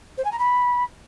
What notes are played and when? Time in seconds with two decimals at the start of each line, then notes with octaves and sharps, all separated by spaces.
0.17 C5
0.24 G#5
0.31 A#5
0.38 B5